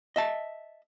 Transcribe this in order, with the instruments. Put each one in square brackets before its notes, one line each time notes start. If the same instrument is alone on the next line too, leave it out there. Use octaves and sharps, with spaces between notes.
[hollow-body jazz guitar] D#5 E5 A5